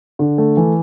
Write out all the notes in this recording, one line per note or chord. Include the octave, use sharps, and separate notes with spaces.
D3
A3
E3